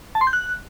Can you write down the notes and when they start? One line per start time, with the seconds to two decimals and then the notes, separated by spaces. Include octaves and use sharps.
0.15 A5
0.21 C6
0.27 G6
0.33 F#6